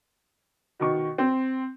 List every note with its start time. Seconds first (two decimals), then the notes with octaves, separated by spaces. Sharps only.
0.79 B2 D#3 C#6
1.18 C4